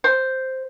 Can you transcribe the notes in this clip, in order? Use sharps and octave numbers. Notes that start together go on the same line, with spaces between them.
C5